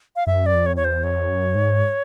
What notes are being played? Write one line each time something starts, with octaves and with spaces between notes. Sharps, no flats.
F5
F#2 E5
D5
F2
C#5
E2 C#5
C5
F2 C#5
F#2
G#2